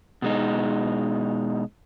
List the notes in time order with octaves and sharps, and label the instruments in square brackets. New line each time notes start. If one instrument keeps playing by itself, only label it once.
[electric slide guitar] B2 G#3 D#4